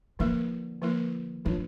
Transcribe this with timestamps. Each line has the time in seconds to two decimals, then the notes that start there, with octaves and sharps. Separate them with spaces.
0.19 D3 F3 A#3 E4 A#4
0.82 F3 A#3 E4 A#4
1.45 E3 F3 A3 D4 F4 C#5